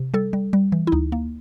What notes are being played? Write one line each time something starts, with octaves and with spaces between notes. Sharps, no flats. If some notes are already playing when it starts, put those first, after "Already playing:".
Already playing: C3
G3 A4
G3
G3
E3
E4
D2 D#4
A#3